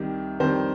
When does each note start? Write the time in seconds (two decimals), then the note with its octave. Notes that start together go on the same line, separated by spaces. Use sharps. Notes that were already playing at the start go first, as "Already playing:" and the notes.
Already playing: C2 C3 D#3 G3 G4
0.40 F2 D#3 G3 C5